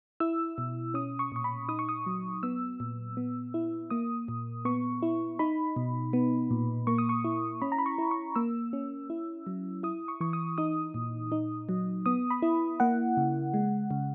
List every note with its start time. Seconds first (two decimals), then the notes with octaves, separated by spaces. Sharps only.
0.20 E4 E6
0.58 B2
0.94 C#4 D#6
1.19 C#6
1.32 A#2 C#6
1.44 B5
1.69 D#4 D#6
1.79 C#6
1.89 D#6
2.06 F#3
2.43 B3 E6
2.80 A#2
3.17 B3
3.54 E4
3.90 A#3 D#6
4.28 A#2
4.65 B3 C#6
5.03 E4
5.39 D#4 B5
5.76 B2
6.13 B3
6.51 A#2
6.87 A#3 C#6
6.98 D#6
7.09 C#6
7.24 E4
7.62 C#4 B5
7.72 A#5
7.78 B5
7.86 C#6
7.98 E4
8.11 C#6
8.35 A#3 E6
8.73 C#4
9.10 E4
9.47 F#3
9.83 E4 D#6
10.08 C#6
10.21 E3 C#6
10.33 D#6
10.58 D#4 D#6
10.94 A#2
11.32 D#4
11.69 F#3
12.06 B3 D#6
12.31 B5
12.42 E4
12.80 A#3 F#5
13.17 C#3
13.54 G#3
13.91 C#3